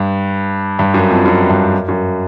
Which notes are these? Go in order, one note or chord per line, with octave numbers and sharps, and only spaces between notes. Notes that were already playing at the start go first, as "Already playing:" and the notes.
Already playing: G2
G2
F#2
F2
F#2
G2
F#2